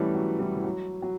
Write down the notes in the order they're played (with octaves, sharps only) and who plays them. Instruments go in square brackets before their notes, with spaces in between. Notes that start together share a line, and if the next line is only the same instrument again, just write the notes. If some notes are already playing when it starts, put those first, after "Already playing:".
Already playing: [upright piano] E3 G3 A3 B3 C#4
F#3
E3 G3
E3
F#3
F#3